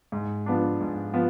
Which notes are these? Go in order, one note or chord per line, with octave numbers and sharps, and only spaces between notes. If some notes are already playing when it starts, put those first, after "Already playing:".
G#2
F3 B3 D4
G#2
F3 B3